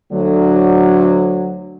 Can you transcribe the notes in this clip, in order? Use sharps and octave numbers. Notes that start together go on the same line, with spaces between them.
D2 D3 F#3